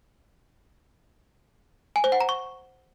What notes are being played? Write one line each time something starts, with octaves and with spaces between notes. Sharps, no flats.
G#5
C5
F#5
A#5
C#6